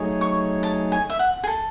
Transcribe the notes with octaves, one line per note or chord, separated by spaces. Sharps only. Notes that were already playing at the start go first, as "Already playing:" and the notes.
Already playing: F#3 A3 D#4 G#4 C#5
C#6
A5
G#5
E5
F#5
G#4
A4